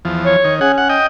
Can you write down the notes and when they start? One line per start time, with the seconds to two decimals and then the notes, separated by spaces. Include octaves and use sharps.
0.05 E2 F3
0.25 C#5
0.44 D#3
0.61 C#4 G#4 F#5
0.78 F#5
0.89 D#5 G5